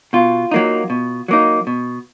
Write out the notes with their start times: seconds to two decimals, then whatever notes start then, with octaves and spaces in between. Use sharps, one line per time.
0.13 B2 F4
0.51 F#3 A#3 D#4
0.90 B2
1.28 F#3 A#3 D#4
1.67 B2